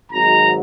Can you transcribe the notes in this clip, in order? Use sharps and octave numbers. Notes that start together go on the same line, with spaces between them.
G#1 G#2 F#3 A#5